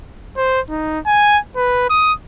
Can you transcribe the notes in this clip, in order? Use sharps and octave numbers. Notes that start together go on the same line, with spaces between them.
C5
D#4
G#5
B4
D#6